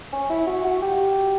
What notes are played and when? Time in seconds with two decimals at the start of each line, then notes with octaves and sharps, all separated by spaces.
0.13 C#4
0.29 E4
0.46 F#4
0.64 F#4
0.82 G4